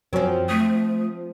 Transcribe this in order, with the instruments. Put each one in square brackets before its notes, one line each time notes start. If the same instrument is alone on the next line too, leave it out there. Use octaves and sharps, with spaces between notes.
[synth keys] F#2 F#3 C#4 [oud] F3 C4
[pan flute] A3 [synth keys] D#6